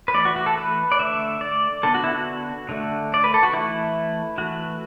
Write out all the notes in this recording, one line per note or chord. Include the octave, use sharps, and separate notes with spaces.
B4
E3 A3 D5
F#4
F#4
A4
B4
D5
D3 A3 E5
D5
D3 B3 A4
F#4
E4
F#4
D3 A3
D5
B4
A4
F#4
E3 A3 E4
E3 A3 F#4